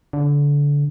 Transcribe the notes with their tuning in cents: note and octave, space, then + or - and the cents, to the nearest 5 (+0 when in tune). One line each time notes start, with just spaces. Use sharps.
D3 -25